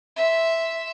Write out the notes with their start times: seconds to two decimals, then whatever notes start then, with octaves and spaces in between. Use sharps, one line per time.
0.16 E5 C6